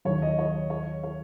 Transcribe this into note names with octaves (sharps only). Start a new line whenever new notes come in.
D#2 D#3 F#3 C#5
D#5
C#5
C#5
C#5